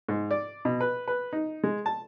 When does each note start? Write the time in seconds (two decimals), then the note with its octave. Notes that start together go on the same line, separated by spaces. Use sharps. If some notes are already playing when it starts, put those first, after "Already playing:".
0.09 G#2
0.31 D5
0.65 B2
0.81 B4
1.08 B4
1.33 D#4
1.64 G#3
1.86 A5